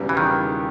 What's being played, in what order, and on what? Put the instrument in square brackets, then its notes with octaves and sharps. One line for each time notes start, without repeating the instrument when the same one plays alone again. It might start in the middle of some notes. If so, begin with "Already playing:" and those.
Already playing: [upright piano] E1 E2 C#3 G3
[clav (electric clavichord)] E3
D#3